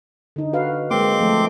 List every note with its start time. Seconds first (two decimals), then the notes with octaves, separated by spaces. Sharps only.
0.36 D3 D#4
0.53 F#4 B4 F5
0.91 G#3 A#3 C4 C6 D6
1.20 F3 A3 A4